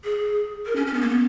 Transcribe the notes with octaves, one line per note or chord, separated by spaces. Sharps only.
G#4
A#4
C#4
C#4
B3
A#3
B3